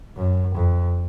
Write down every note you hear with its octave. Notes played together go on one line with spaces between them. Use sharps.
F#2
F2